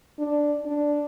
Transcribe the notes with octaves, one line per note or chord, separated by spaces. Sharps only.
D4
D4